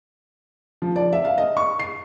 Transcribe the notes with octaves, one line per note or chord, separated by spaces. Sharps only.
F3
D5
E5
F5
D#5
C#6
C7